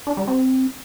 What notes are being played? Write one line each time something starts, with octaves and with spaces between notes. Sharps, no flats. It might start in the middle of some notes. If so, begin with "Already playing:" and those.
D4
G3
C4